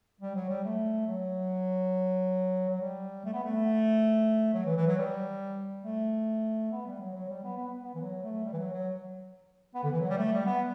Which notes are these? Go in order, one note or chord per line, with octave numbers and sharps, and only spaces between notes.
G3
F#3
G3
A3
F#3
F#3
G3
A3
B3
A3
F#3
E3
E3
F#3
G3
A3
B3
G3
F#3
F#3
G3
B3
B3
B3
E3
F#3
A3
G3
E3
F#3
F#3
B3
D3
E3
F#3
G3
A3
G3
B3